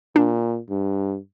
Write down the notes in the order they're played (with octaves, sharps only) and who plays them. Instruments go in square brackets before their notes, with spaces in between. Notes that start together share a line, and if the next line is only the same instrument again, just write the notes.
[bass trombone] A#2 [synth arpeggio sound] D4
[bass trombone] G2